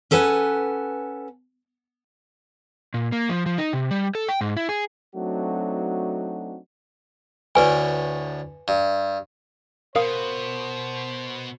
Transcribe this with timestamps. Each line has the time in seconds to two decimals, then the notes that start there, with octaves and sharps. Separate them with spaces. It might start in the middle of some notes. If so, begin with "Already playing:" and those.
0.11 C#4 A4 B4 F#5 G#5
2.94 A#2
3.12 A#3
3.29 F3
3.46 F3
3.58 D#4
3.73 C3
3.91 G3
4.15 A4
4.28 G5
4.41 G#2
4.57 E4
4.69 G#4
5.15 F#3 A3 C4 D4 D#4 F#4
7.55 D2 A2 D3 B4 G#5
8.68 G2
9.96 B2 A#4 C5 F5 D#6